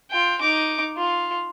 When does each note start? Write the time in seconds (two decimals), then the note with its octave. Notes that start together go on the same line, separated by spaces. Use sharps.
0.11 F4 G5
0.41 D#4 D6
0.97 F4